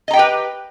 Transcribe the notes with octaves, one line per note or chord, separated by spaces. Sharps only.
G4 B4 D#5 G5 A#5